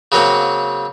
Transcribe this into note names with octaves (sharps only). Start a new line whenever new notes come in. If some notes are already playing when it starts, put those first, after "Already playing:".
C#3 F#3 A#3 C4